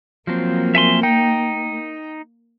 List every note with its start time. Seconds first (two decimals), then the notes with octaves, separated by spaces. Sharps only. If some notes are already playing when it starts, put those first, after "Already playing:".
0.27 F3 F#3 A#3 C4
0.75 E5 G#5 C6
1.03 D#4 G5